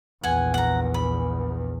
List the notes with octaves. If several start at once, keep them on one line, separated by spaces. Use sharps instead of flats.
A#1 E2 F#5 G#5
F#5 A#5
B5